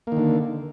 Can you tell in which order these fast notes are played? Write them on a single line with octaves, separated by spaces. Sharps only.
A#3 D#3 D3